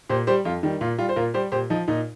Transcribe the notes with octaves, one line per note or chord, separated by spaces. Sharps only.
A#2 G4 C5
G3 G4 C5
F2 F4
D#3 G3
A#2 F4
G3 F4
C5
A#2 F4 A#4
G3 G4 C5
A#2 G4 C5
F3 D#4
A#2 D#4